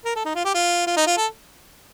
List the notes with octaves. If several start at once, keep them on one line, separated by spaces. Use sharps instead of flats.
A#4
A4
D#4
F4
G4
F4
F4
D#4
F4
A4